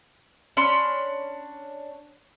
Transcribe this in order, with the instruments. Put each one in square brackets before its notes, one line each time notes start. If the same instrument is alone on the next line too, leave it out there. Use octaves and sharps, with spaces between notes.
[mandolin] C#4 D4 B5 C6